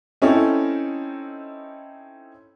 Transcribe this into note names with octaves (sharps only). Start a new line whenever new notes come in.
C4 C#4 D#4 E4 A4